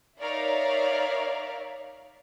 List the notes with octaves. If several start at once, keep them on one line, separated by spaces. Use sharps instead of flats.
D#4 A#4 C#5 D5 E5 F5